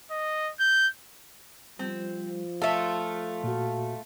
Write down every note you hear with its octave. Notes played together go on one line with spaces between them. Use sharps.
D#5
G6
F3 G3 C4
A3 F4 A4 E5 F5
A#2 F#4